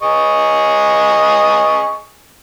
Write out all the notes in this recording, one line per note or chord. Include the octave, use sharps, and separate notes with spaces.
G#4 D#5 C#6